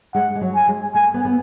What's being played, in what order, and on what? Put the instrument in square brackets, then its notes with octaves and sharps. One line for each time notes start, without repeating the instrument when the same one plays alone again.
[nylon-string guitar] G#3 [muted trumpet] F#5
[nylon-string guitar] G#3
F#3
[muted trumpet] G#5
[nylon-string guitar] G#3
[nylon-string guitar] A3 [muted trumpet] G#5
[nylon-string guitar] B3
B3